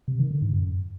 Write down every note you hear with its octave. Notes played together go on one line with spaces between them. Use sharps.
C3
D#3
D3
G#2
F#2